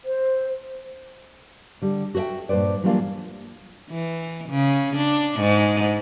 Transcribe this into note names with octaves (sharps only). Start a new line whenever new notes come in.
C5
D3 G3
F#4 A4 C5 E5 G5
G2 A#2 B4 C5 D5
E3 F#3 G3 A#3 D4 F4
E3
C#3
D4
G#2